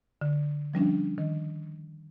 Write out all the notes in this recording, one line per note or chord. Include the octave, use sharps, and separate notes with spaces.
D3
F3 G3 C#4 D4
D#3